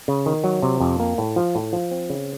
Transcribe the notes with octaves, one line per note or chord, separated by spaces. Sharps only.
C#3
D#3
F#3
C3
F2
A#3
A2
F3
A2
F3
C4
C#3